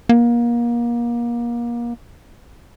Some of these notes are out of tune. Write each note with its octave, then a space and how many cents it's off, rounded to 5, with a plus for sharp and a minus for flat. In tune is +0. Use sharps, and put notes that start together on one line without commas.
A#3 +30